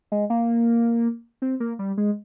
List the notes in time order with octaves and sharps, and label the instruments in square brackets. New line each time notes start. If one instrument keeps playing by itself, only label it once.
[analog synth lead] G#3
A#3
C4
A#3
G3
G#3